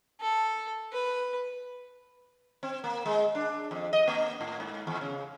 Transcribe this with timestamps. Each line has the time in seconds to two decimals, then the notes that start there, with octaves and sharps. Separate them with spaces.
0.20 A4
0.92 B4
2.63 C4
2.84 A#3
3.06 G#3
3.35 D4
3.71 F2
3.93 D#5
4.08 A#3
4.41 A2
4.60 G#2
4.87 E2
5.01 C#3